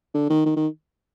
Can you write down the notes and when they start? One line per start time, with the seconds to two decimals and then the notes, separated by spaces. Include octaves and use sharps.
0.14 D3
0.30 D#3
0.46 D#3
0.56 D#3